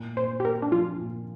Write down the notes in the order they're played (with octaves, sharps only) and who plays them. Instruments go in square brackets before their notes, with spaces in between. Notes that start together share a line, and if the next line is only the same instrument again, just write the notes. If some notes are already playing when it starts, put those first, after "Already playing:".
Already playing: [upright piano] A#2
[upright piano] A#2 [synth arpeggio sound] C5
[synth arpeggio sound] G4
[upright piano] A#3 [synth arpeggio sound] A#4
[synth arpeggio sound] D4
[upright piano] F3 [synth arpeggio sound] F4
[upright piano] A#2